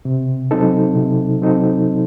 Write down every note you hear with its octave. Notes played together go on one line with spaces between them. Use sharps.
C3
F#3 C4 D#4 A4
C3
F#3 C4 D#4 A4